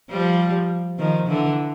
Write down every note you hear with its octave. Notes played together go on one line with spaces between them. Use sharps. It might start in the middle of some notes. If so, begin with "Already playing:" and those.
F3 G3
D#3 F3
D3 E3